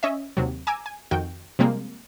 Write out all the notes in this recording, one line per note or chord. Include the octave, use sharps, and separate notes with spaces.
C#4 D#5 E5
D#2 C3 F#3
G#5 A#5 D6 E6
G#5
F2 D#3 F#4 G5
C3 F3 G3 G#3 A#3 C4